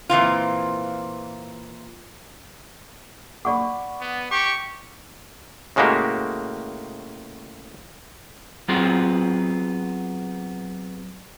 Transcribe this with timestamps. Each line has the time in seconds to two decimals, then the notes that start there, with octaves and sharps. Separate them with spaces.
0.09 A#2 E3 C4 F4
3.45 D5 F#5 B5 C#6 D6
4.01 B3
4.31 G4 C#6
5.76 A2 C#3 G#3 A#3 F#4 G4
8.68 F#3 B3 C4 F4 G#4